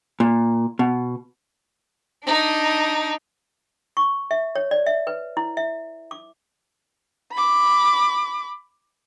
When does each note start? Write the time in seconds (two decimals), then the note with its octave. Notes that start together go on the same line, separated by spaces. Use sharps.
0.20 A#2
0.79 B2
2.24 D4 D#4
3.97 C#6
4.31 E5
4.55 C#5
4.71 D5
4.86 E5
5.07 B4
5.37 E4
5.57 E5
6.11 D6
7.32 B5 D6